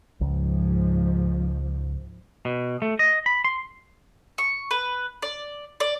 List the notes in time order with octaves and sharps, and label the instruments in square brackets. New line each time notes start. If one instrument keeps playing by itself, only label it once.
[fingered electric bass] C#2 [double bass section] G#2 F3
[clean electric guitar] B2
A3
D#5
B5
C6
[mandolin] C#6
B4
D5
D5